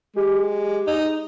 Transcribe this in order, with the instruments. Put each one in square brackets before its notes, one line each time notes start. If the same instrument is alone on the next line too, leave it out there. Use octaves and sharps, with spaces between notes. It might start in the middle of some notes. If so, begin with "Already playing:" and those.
[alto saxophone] G#3 [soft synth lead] G4
[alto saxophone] D#4